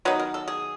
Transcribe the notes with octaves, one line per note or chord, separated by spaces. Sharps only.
D#3 F#3 B3 D#4 B4
A#4
A4
G#4